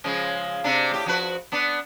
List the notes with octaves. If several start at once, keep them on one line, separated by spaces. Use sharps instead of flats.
C#3 F3 G#3
C3 D4
A2 G4
F3 F#4 B4
B3 D4